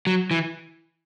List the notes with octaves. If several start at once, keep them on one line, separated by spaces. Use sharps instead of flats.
F#3
E3